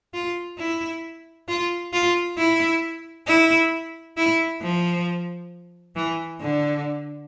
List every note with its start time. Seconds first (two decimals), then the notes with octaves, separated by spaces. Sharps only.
0.14 F4
0.59 E4
1.48 F4
1.93 F4
2.38 E4
3.27 E4
4.17 E4
4.62 F3
5.96 E3
6.41 D3